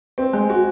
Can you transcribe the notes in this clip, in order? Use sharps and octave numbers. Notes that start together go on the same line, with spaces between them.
C4
G#3
F#4